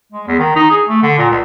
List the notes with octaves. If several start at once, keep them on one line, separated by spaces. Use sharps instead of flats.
G#3
E2
D#3
D#4
G#4
A3
D3
A#2
C#2